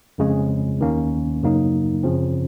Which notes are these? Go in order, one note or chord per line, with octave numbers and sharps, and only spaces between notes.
F2 C#3 G#3
D#2 D#3 A#3 C#4
F#2 C#3 F#3 A#3 D#4
F#2 C#3 F3 C4